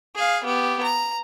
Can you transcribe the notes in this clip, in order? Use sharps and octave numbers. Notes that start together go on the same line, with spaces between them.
G#4 F5
B3 G4
A#5